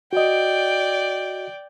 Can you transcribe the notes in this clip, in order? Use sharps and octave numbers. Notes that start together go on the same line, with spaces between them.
F#4 D5 D#5 G5